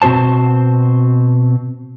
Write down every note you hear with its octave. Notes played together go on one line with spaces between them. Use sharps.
B2 C4 F#4 C5 A5